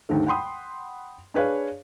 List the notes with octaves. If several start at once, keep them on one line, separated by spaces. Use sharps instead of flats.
D#2 G#2 D3 A3
F#5 G5 B5 C6 D#6
D4 G#4 B4 C#5 F5